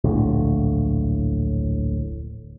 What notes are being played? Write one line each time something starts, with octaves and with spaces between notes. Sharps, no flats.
D1 A#1 A2 D3